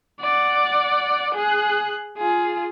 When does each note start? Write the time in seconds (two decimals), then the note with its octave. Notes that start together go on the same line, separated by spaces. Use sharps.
0.20 D5 F#5
1.35 G#4 F#6
2.18 F4 G#4